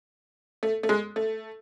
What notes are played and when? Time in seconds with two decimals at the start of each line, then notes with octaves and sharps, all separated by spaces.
0.63 A3
0.83 A3
0.89 G#3
1.16 A3